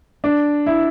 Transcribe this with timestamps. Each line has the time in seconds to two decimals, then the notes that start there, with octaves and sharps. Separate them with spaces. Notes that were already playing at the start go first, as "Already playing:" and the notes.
0.24 D4
0.67 E4